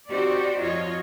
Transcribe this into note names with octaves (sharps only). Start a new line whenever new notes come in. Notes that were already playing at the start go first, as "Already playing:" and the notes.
C4 D#4 F#4 G4 C5 D5
F2 F4 F#4 C#5 D#5